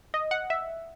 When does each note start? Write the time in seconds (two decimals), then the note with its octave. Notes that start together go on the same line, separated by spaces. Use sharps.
0.14 D#5
0.31 F#5
0.50 E5